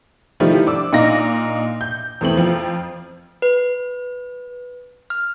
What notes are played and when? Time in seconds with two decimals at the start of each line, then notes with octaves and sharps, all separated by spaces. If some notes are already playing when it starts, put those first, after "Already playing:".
0.40 D#3 F3 G3 A3 E4
0.66 D4 D6 E6
0.93 A#2 D4 D#4 F5 A#6
1.81 G6
2.21 E2 A3 C4 F#7
2.37 F2 F3
3.42 B4
5.10 F6